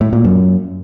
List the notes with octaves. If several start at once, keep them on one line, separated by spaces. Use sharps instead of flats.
A2
A#2
F#2